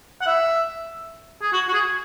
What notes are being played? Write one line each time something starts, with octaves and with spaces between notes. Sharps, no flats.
F#5
E5
G#4
F#4
F#4
G#4